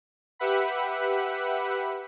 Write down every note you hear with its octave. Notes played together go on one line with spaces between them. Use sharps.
G4 B4 E5 F#5 B5